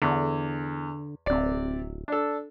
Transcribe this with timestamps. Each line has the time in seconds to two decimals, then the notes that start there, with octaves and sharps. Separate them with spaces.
0.02 E2 D3
1.26 D1 C3 D5
2.08 D4 A4